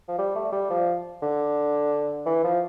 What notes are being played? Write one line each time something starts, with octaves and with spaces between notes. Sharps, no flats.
F3
G3
A3
G3
F3
D3
E3
F3